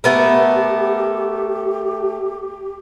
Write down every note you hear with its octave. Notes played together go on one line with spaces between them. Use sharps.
A3 B3 G4 A#4